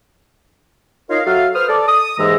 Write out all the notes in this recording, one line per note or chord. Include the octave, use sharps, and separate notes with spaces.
D#4 F4 A#4 C#5 D#5 F5
F#3 F#4 A4 E5 F5
B4 C5 D#6 F6
A4 D5
D#6
D#2 G#2 E3 G#3 E5 A#5